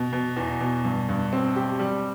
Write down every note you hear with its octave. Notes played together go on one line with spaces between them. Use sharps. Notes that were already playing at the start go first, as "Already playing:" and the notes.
Already playing: B2
B2
E2
B2
G2
G2
C4
G4
G3